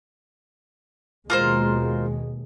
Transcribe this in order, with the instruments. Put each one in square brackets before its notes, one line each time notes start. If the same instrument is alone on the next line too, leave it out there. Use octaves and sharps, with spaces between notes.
[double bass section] D#2 B2 G#3 [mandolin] F4 A#4 C5